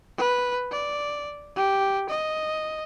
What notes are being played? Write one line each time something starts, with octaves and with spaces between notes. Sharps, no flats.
B4
D5
G4
D#5